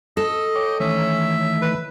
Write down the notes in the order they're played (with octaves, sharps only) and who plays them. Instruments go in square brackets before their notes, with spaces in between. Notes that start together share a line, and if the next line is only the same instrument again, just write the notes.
[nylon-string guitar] A4 [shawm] D#5
[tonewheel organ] C#5 G5 D6
[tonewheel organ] D#3 E3 A3 [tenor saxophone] C#4 [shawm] E5
[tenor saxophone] B4